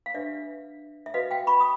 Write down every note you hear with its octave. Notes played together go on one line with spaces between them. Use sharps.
F5
D4 G4 B4 D5 E5
E5
F#4 B4 D#5 F5
F5 G5
B5 C#6
D#6